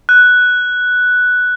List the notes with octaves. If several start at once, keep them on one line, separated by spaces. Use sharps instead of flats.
F#6